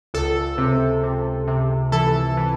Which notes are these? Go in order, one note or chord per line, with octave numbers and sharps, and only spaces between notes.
C#2 A4
C3
C3
C3
E3 A4
E3